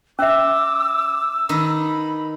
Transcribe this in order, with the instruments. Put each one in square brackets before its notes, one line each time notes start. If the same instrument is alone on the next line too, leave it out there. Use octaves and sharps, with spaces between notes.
[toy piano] C#4 E5 [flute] D6 [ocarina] E6
[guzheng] D#3 D#4 B4 [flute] B5